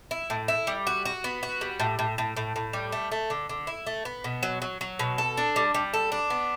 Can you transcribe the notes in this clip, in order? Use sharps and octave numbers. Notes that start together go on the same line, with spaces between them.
E4
A2
E4
G3
F#4
F#4
B3
F#4
G3
A2
A2
A2
A2
A2
G3
A3
A3
D3
D3
E4
A3
B3
B2
F#3
F#3
F#3
B2
A4
D4
G3
G3
A4
D4
B3